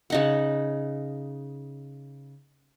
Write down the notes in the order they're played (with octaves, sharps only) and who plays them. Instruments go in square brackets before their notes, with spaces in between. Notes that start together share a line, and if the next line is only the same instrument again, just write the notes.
[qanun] C#3 D#4 F#5